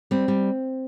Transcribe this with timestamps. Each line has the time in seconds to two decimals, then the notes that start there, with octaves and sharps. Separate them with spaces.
0.11 G3 C4
0.28 G3